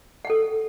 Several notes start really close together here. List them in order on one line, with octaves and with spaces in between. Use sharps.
F#5 G5 A4